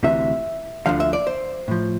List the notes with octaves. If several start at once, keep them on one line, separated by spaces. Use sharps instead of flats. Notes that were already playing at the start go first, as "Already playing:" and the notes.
D2 C3 E3 E5
D2 D3 F3 F5
E5
D5
C5
A2 F3